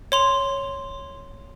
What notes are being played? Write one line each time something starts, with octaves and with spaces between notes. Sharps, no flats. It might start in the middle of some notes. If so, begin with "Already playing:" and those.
C#5 C6 F7